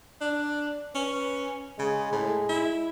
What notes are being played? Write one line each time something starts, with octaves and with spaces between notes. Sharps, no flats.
D4 D5
C#4 B4
C#3 G#3
A2
E4